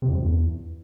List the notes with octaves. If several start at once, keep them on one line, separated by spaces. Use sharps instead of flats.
C3
F2
G2
F2
E2